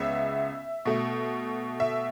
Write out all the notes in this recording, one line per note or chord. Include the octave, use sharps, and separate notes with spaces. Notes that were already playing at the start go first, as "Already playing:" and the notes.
Already playing: C#2 C#3 B3 E5
B2 A3
E5